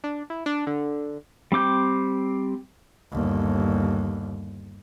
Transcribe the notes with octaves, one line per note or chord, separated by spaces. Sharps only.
D4
E4
D4
D3
G3 C4 D6 G6
G1 D#2